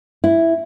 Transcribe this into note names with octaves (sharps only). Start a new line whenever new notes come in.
E4